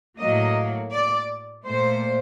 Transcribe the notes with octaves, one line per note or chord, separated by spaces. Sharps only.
A2 F#3 A#3 D#5
D5
A#2 A3 C5